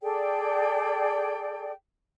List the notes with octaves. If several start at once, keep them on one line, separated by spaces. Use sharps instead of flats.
G#4 A4 D5 G5